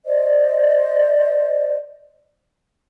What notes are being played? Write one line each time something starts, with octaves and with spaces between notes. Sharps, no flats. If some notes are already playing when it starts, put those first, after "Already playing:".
C5 D5 D#5